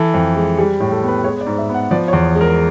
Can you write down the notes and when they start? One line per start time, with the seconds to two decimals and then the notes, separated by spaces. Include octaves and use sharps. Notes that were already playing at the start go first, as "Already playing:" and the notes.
Already playing: E3 A4
0.14 F2
0.36 G#3
0.58 G3 G#4
0.80 A2
0.92 A4
1.03 B3 B4
1.24 G#3 C#5
1.41 D5
1.46 G#2
1.58 E5
1.69 B3
1.74 F#5
1.91 F3 D5
2.08 C#5
2.13 E2
2.36 G#3
2.41 A#4